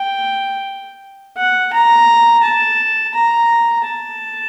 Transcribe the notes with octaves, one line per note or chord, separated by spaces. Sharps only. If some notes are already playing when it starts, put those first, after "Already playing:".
Already playing: G5
F#5
A#5
A5
A#5
A5